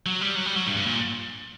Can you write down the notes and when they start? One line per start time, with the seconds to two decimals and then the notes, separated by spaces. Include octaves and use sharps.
0.06 F#3
0.21 G3
0.36 F#3
0.46 G3
0.56 F#3
0.67 G2
0.77 G2
0.86 A#2